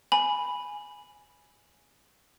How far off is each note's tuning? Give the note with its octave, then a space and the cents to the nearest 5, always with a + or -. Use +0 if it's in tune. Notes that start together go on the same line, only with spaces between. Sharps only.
G#5 +0 B5 +0